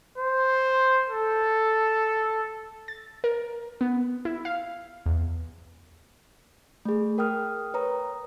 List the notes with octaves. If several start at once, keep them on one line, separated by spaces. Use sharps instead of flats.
C5
A4
A6
A#4
B3
E4
F5
E2
A3 G#4
A#4 G5 D#6 F6
B4 C#5 A#5 D#6